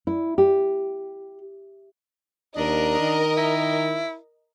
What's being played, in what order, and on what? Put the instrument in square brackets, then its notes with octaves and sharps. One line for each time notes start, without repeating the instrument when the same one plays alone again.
[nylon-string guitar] E4
G4
[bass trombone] D#2 [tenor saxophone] D4 [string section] A#4 D#5
[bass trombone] D#3
[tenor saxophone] E4